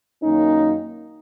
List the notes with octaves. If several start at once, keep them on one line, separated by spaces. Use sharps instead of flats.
F#2 D#3 A#3 C#4 D#4